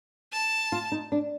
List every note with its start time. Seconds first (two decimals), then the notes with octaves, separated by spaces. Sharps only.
0.32 A5
0.72 F4
0.92 D#4
1.12 D4